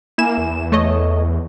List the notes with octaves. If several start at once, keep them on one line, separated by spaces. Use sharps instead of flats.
A#3 E4 G#5 E7
E2
A3 C#5 D#5